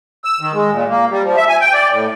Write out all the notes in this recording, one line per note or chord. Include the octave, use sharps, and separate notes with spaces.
E6
D#3
G#3
A#2
A#3
G3
F3
E5
G#5
G5
D5
A2